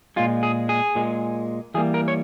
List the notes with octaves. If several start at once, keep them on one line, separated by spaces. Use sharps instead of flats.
A#2 G#3 F4
G#4
G#4
A#2 G#3
E3 G3 A#3 G#4
A#4
C#5